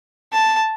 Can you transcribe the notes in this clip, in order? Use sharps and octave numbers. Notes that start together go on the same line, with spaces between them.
A5